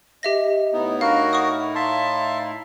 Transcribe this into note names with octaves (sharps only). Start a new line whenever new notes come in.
G4 D#5 E5 A#6
A2 B3 D#4 E4
D4 F#4 A#4 F5
F#5 C#6 D#6
E5 F5 A5 C6